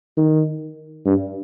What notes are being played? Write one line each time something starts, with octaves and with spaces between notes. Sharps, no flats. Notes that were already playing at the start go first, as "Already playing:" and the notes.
D#3
G2